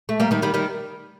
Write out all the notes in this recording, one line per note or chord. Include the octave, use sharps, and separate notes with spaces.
A3
G3 A#3
D#3 G3
D#3 G3
D#3 G3